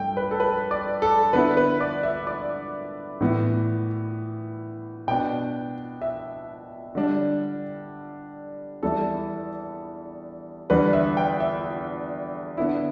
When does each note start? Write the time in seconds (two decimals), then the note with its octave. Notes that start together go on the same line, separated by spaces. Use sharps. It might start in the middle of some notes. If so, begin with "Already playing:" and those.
Already playing: G2 A3 D4 G5
0.17 B4
0.31 A4
0.40 B4
0.71 D5
1.02 A4
1.33 D3 B3 E4 B4
1.57 B4
1.81 D5
2.03 E5
2.27 D5
3.20 A2 E3 B3 E4
5.07 B2 B3 D4 G5
6.02 E5
6.95 D3 G3 D4
8.83 E2 E3 G3 E4 A4
10.70 E2 D3 G3 B3 B4
10.93 E5
11.17 G5
11.40 E5
12.57 D3 B3 E4